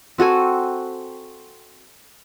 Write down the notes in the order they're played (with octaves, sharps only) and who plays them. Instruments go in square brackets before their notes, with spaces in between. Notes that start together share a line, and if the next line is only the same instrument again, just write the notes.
[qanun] C4 F#4 A4 G#5